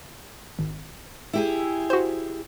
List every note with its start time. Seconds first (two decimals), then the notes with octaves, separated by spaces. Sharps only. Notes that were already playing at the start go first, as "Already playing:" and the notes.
0.59 G#1
1.33 E4 G4 G#4
1.90 F#4 C5